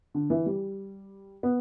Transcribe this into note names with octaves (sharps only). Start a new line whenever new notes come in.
D3
E3
G3
B3